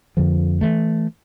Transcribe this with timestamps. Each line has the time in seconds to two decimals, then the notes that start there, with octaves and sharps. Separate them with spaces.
0.17 F2 D3 F3
0.61 E3 A3